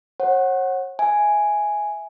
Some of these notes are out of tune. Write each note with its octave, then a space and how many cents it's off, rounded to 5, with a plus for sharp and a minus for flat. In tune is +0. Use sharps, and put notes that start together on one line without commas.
C#5 -40 F#5 +0
E5 +0 G#5 +0